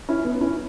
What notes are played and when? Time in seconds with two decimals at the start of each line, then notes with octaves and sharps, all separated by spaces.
0.09 C#4 E4
0.25 B3 D#4
0.41 C#4 E4